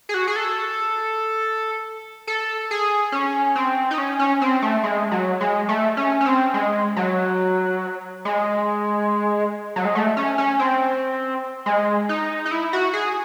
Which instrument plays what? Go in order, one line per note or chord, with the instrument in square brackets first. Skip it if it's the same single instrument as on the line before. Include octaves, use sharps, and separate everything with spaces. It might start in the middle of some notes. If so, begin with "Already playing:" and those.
[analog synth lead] G#4
F#4
G#4
A4
A4
G#4
C#4
C4
D#4
C#4
C#4
C4
A3
G#3
F#3
G#3
A3
C#4
C#4
C4
G#3
F#3
G#3
F#3
G#3
A3
C#4
C#4
C4
G#3
D#4
D#4
E4
F#4
G#4